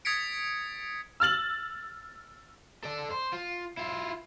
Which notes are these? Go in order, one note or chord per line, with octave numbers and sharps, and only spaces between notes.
D#6 G#6 A6 B6 C#7 D7
E6 F6 A6 F#7
A4 D5
C5
F4
E4 F4